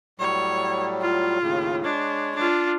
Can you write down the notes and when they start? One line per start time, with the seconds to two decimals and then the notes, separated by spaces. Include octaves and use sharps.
0.19 A2 F#3 G3 C#5
1.01 F4
1.42 D#2 A2 C#3
1.84 G#3 D4 C#5
2.35 D4 F4